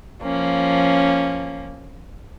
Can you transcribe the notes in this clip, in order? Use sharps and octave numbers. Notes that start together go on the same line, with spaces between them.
F3 A#3 C#4